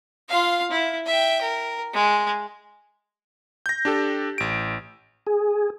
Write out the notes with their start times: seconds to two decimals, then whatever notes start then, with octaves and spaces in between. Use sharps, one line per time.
0.29 F4 F5
0.71 E4
1.06 E5 G5
1.41 A#4
1.93 G#3
3.66 G6 A#6
3.85 D4 G4 A4
4.38 A1 D7
5.27 G#4